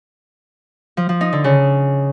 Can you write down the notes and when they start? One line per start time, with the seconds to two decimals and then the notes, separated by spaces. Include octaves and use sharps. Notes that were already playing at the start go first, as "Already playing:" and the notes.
0.97 F3
1.09 F3
1.21 D#4
1.33 D3
1.44 C#3